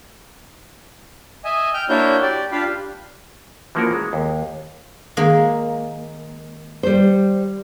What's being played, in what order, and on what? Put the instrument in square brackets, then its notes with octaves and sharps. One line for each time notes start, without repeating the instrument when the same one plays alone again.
[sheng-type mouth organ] D#5 E5 G#5
G5 F6 G6
A#3 D4 E4 F#4 C#5 G6
G4 D5
D4 F4 G4 F5 B5
[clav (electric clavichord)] E3 F3 A#3 C#4 F#4 A#4
G#3
D#2
[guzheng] D#3 G#3 A#3
[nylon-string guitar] G3 C5